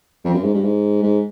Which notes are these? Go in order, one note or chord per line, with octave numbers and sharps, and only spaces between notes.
F2
F#2
G#2
G2
G#2
G#2